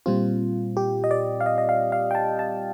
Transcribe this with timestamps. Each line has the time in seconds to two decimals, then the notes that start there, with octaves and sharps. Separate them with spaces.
0.06 A#2 G3 C4 F4
0.77 G4
1.04 D#5
1.11 D5
1.41 F5
1.46 D#5
1.58 D#5
1.69 F5
1.92 F5
2.11 G5
2.15 A5
2.39 A5